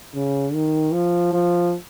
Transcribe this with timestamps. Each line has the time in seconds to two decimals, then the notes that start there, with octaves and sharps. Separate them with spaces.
0.14 C#3
0.54 D#3
0.93 F3
1.33 F3